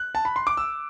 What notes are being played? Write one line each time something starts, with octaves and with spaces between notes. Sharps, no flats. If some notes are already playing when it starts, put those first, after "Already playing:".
Already playing: F#6
A5
B5
C6
D6
E6